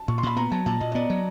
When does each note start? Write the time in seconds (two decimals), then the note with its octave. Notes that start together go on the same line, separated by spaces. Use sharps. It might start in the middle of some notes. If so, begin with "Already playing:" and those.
Already playing: A5
0.08 A#2 C#6
0.18 C6
0.23 A#2 B5
0.36 B3 A#5
0.52 F#3 A5
0.66 A#2 A5
0.80 A#2 D#5
0.92 D#5
0.95 B3 D5
1.10 F#3